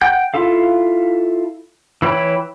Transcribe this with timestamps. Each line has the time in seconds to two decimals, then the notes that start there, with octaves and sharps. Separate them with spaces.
0.01 F#5 G5 G6
0.34 E4 F4 A4 F5
2.02 E3 E4 C#5 G5 B5